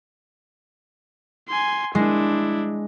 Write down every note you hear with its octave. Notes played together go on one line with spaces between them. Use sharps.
G#5 C6
G#3 D4 E4